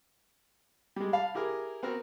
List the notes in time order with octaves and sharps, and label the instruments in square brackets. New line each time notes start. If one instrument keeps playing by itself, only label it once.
[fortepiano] G3 G#3
F5 A5 B5
E4 G4 G#4 A#4
B3 C4 F#4 A#4